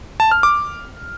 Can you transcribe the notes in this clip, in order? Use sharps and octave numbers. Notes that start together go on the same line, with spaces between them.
A5
F6
D6